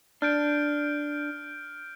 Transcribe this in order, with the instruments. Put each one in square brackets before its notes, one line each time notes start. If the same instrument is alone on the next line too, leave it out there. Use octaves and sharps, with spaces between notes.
[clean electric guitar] D4 [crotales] F6 G6 D7